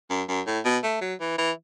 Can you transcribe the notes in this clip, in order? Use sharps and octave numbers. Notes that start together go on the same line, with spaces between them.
F#2
F#2
A2
B2
A3
F#3
E3
E3